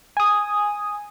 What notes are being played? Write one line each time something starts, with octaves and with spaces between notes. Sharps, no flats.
G#5 D#6